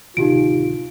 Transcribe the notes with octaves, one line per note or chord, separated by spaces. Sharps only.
D1 C3 D#3 D#4 F4 G4 D7